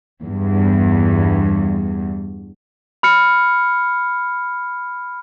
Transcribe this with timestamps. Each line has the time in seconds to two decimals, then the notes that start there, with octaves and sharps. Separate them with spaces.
0.22 E2 G2
3.03 B5 F6 C#7